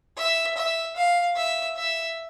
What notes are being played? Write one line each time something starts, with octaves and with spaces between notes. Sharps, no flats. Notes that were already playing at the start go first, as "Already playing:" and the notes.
E5
E5
F5
E5
E5